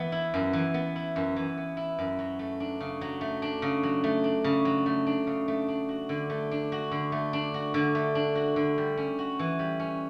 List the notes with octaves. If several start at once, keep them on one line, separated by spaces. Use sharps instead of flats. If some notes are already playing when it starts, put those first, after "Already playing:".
Already playing: E3 B3
E4
F#2
E3
B3
E4
F#2
E3
B3
E4
F#2
F#3
A3
D4
C#3
F#3
A3
D4
C#3
F#3
A3
D4
C#3
F#3
A3
D4
C#3
A3
D4
F#4
D3
A3
D4
F#4
D3
A3
D4
F#4
D3
A3
D4
F#4
D3
G3
C#4
F#4
E3
G3
C#4